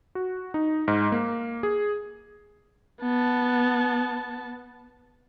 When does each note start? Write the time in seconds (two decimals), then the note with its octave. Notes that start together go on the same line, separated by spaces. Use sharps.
0.15 F#4
0.54 D#4
0.88 G#2
1.12 A#3
1.63 G#4
3.01 B3 A5